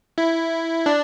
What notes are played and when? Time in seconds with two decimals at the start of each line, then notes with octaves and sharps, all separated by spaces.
0.18 E4
0.86 D4